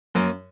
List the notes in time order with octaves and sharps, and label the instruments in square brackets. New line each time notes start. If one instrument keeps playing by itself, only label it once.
[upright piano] F#2 [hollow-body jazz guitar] A#3 C#4